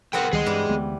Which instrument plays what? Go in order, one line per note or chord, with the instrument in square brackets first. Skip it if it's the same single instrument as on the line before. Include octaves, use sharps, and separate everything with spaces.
[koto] B3 C4 F#4 [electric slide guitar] A#4 F#5 G5
[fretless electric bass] C#2 D#3 G3 [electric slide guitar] G#4 D#5
[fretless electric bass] G2 [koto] E3 G3
[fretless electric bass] D2 G#3 B3